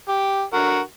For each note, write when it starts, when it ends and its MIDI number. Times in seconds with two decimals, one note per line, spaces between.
0.08 0.44 67
0.53 0.80 50
0.53 0.80 66
0.53 0.80 70